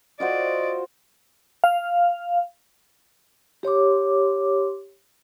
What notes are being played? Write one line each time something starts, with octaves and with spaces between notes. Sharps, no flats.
F4 F#4 C5 D5 D#5
F5
G4 C#5 C6 D6